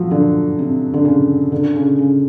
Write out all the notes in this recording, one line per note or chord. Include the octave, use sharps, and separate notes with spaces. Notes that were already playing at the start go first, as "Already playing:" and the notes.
Already playing: F3 F#3
D3
C3
D3
C#3
D3
C#3
C#3